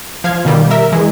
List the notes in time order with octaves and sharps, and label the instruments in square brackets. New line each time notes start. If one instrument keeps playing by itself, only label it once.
[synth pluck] F3 F5 G#6
B2 D#3 G3
A#4 E5
E3 G#3